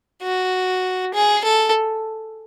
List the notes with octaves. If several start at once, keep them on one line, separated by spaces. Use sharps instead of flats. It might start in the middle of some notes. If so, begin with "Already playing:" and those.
F#4
G#4
A4